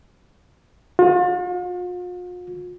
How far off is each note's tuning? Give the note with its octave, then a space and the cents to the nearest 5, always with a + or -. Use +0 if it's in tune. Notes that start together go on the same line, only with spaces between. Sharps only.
F4 +45